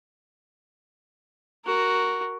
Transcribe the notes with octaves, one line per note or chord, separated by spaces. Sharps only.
F#4 A#4